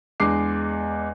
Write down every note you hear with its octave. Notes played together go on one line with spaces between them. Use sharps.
E2 G#3 D4 D6 C7